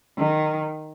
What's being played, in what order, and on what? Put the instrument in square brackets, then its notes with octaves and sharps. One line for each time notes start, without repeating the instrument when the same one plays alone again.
[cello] D#3